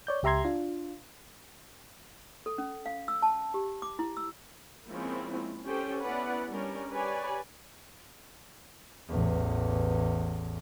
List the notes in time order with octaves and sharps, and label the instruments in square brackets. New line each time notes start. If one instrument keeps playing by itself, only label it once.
[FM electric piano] C#5 D5 G6
C#2 G4 E5 A#5 C6 G#6
D4 F4
[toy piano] A4
C#4
F5
E6
A5
G4
D6
E4
E6
[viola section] F3 G#3 A#3 C4 C#4 E4
C#4 G4 A4 C5 G5
B3 C#4 E4 B4 D5 F#5
G3 C#4 D4 A#4
G4 B4 C#5 D5 G#5
[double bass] A1 E2